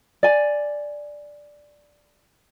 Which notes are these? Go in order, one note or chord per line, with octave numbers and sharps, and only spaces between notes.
D5 G#5